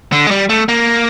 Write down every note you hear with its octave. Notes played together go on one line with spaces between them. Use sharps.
D3
G#3
G3
A3
A#3